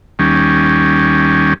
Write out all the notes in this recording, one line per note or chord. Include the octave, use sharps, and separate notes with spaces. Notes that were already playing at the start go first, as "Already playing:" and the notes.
D#2 G3 C#4